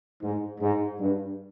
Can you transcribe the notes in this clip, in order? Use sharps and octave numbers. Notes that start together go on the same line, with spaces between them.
G#2
G#2
G2